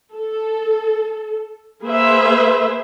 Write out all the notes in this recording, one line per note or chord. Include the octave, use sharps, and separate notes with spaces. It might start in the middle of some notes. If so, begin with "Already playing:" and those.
A4
A#3 G#4 B4 C5 E5